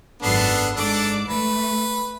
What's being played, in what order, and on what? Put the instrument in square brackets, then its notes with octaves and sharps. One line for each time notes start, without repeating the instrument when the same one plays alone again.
[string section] G#1 F#2 C7 [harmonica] B3 D4 A4
[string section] G#2 D5 D6 [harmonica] D4 A4
[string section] A3 [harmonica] B4